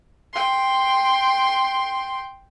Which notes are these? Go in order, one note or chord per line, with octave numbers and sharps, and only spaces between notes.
G5 C6